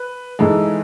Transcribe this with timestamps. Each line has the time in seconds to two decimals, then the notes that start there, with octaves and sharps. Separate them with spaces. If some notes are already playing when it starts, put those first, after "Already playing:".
Already playing: B4
0.39 G#2 E3 G#3 A4